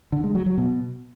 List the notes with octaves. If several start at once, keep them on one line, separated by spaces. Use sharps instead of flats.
D3
G#3
F#3
F#3
B2